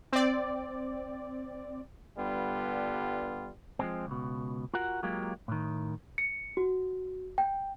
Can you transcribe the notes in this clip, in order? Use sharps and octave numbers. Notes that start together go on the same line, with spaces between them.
C4 D5
G2 D3 G3 B3 F4
F3 G#3 C4
C#2 B2
F4 F#4 A#4 F#5
F#3 G#3 A#3 F4 G4
A2 D#3
C#7
F#4
G5